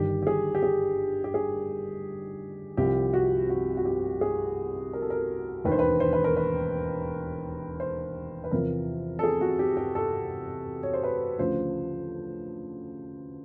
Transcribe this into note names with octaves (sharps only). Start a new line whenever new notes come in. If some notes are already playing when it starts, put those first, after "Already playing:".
Already playing: G1 G2 D#3 G4
G4
G#4
G4
G#4
G4
G#4
C2 C3 F3 G4
F#4
F#4
F#4
G4
G#4
A#4
A4
A#4
E1 D#2 D#3 B4
C5
B4
C5
B4
A#4
B4
C5
B4
E2 C3 F3 A#4
A4
G#4
F#4
G4
G4
A4
C#5
C5
B4
D2 C#3 F3 C5